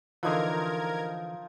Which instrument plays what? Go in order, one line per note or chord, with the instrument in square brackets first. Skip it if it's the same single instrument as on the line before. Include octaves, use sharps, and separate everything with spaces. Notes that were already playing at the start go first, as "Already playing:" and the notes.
[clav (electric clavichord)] D3 E3 [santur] F3 D#4 D#6 [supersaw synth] A#4 G#6